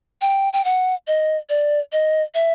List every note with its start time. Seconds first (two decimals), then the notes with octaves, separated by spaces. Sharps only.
0.22 G5
0.53 G5
0.65 F#5
1.07 D#5
1.49 D5
1.92 D#5
2.35 E5